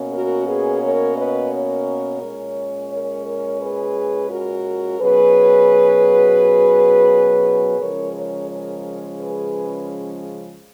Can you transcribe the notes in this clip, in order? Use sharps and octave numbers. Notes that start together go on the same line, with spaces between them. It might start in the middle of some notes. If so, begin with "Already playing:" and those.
Already playing: B2 A#3 C#4
F#4 A#4
G#4 B4
A#4 C#5
B4 D#5
A#4 C#5
A#2 G#3 C#4
A#4 C#5
A#4 C#5
G#4 B4
F#4 A#4
B2 F#3 C#4 G#4 B4
C#3 F3 G#3 C#4 A#4 C#5
A#4 C#5
A#4 C#5
G#4 B4